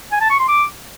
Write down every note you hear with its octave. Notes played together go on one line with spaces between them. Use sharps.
G#5
A5
C#6
C6
D6